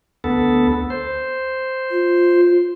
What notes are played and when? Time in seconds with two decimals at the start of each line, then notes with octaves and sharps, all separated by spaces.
0.24 D2 B3 A4
0.90 C5
1.91 F4